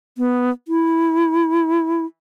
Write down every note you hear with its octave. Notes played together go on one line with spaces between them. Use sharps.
B3
E4